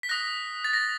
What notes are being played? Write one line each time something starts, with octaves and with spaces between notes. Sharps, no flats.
B6
D#6 F#6 A#6
A6
A#6